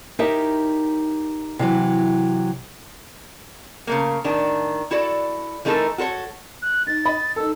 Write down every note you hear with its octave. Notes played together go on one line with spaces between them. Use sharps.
D#4 G4 A#4 C#5 E5
C3 E3 F#3
C#3 A3 A#3
A2 D#3 D4
E4 F#4 A4 D5
E3 A3 D#4 F#4 A4 A#4
F#4 A4 C5 C#5
F#6
D#4 A6
D#5 B5
D#4 A4 E6